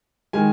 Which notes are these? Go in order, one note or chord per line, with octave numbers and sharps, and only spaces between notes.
D#3 G#3 G#5